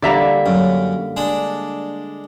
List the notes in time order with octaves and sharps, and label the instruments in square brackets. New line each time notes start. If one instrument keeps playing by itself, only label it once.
[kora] D3 G3 A#3 [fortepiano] D5 E5 A#5
[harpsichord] F#2
G#3 D4